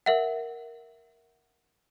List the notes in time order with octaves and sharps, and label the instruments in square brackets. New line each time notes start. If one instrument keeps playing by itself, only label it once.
[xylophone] A#4 E5 F#5